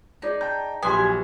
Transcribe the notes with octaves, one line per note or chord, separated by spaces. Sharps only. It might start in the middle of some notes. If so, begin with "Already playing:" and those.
D#4 G#4 D5
G5 A5 A#5 G6
A#1 F#3 G4 B4 G#5 C6 D#6